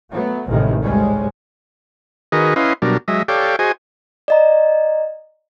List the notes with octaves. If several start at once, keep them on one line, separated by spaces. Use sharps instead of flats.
F#3 A3 B3
A1 D#2 A2 C3 D#3 G#3
D2 G#2 G3 G#3 C#4
D#3 F#4 G#4 A#4 B4 D#5
C#4 E4 B4 D#5 F5 C6
B2 F#3 G3 D4 A#4
F#3 G#3 D#5 E5
G4 A4 C#5 D5 F5 G5
F#4 G#4 C5 D#5 G#5
D5 D#5 A#5